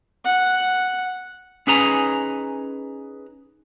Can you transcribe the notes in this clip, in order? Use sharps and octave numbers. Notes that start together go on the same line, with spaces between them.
F#5
C#4 D#4 G#4 B4 G#5 A#5